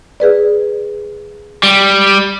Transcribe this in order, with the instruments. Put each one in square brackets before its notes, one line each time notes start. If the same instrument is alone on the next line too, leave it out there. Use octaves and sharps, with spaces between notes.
[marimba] G#4 B4 D5
[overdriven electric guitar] G3